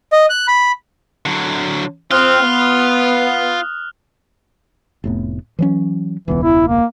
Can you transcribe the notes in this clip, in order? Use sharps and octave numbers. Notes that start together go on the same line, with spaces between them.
D#5
F#6
B5
D3 F#3
C4 F4 D#6 F6 F#6
B3
F1 A2 B3
E3 F#3 C#4
E1 C#2 E3 B3
E4
A#3